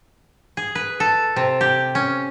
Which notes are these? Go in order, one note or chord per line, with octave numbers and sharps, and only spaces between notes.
G#4
B4
A4
C3
G4
C#4